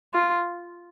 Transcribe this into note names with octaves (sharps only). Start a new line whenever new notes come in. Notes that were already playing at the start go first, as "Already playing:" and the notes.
F4